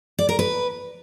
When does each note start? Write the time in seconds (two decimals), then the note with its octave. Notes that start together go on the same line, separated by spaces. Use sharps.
0.19 D5
0.29 A#4
0.39 B4